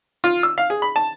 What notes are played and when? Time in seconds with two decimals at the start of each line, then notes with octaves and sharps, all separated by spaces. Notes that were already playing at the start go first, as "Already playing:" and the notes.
0.24 F4
0.43 E6
0.58 F5
0.70 G#4
0.82 B5
0.96 A5